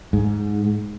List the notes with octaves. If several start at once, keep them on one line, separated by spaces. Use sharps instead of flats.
G#2